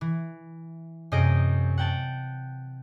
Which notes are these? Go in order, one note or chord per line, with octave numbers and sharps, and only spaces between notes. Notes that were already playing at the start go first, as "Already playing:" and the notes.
E3
F#2 C3 G#4 D#5 G6 D7
F#5 G5 A5